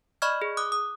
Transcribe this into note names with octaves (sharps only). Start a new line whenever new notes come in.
D5 D#5 B5 C#6 F6 G#6
G#4
D6 D#6 F#6
D#6